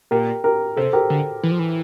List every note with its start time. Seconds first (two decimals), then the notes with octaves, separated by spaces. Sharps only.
0.11 A#2 G4 A#4
0.44 G4 A#4
0.77 C3 A4 C5
0.93 G4 A#4
1.10 D3
1.43 E3
1.51 F3
1.59 E3